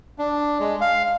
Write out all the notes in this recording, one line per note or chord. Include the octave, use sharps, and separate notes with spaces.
D4
G#3
F5